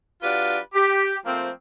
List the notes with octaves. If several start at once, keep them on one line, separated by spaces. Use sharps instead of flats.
F#3 D4 F4 G4 B4
G4
F3 A3 A#3 C4